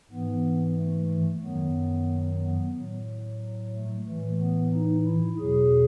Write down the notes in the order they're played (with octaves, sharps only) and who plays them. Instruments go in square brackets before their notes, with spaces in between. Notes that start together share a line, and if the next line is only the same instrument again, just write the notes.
[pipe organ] G#2 E3 B3
A3
A3
F#2 D#3 F#3 B3
B3
A2 F#3
A3
A2 E3 A3
B3
D#4
E4
E2 B2 F#3 G#4